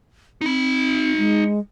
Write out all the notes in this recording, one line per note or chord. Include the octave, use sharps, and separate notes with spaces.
C4 D#4 B5
G#3